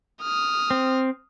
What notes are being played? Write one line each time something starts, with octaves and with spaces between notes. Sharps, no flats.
D#6 F6
C4